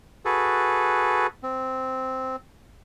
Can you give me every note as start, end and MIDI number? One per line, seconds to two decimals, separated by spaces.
0.25 1.27 66
0.25 1.27 68
0.25 1.27 69
0.25 1.27 71
1.43 2.36 60